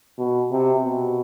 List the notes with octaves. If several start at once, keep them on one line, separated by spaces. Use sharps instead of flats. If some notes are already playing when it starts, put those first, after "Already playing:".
B2
C3
B2